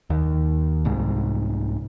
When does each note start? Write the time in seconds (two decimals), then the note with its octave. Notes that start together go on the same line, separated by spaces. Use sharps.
0.10 D#2
0.85 C2 G#2